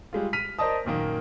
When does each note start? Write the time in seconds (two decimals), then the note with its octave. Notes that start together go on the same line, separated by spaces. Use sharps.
0.13 G3 G#3 F4
0.33 F6 B6 D#7 F7
0.59 A#4 C5 D5 D#5 A5 D#6
0.85 F#2 A#2 D#3 A#3